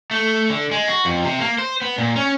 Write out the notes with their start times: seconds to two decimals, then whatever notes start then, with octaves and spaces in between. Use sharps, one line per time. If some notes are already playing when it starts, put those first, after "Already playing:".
0.11 A3
0.50 D3
0.71 G#3
0.88 F#4
1.05 F2
1.24 C3
1.40 A#3
1.59 C5
1.82 B3
1.98 A#2
2.16 C#4